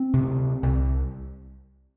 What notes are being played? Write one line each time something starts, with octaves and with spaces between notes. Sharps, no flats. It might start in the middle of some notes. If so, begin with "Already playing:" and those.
Already playing: C4
D2 C3
C2 C3